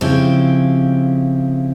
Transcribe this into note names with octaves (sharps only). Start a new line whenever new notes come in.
C#3 F3 C4 E4 G4